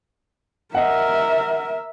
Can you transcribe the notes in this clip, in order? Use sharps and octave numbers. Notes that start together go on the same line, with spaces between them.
A#4 D#5 E5 F#5